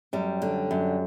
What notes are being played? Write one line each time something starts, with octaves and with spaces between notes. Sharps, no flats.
F#2 G3
D3
F#2